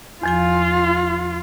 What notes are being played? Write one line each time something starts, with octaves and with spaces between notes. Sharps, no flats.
E2 F3 F4 G#5